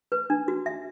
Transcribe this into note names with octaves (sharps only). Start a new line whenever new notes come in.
B4
D4
F#4
E5